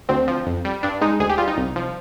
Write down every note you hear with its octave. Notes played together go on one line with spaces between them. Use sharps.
D2 C4
F3
F2
G3
G2 D4
G#3 D#4
D2 G#4
G4
G3 F4
D#4
C2
F3